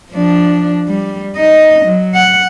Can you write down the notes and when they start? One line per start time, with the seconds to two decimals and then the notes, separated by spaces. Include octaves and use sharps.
0.12 F3 D4
0.88 G3
1.37 D#4 D#5
1.85 F#3
2.15 F#5